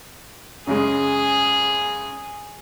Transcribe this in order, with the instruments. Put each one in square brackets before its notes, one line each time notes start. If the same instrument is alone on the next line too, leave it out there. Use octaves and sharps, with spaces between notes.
[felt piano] F#2 C#3 G#3 [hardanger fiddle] G#4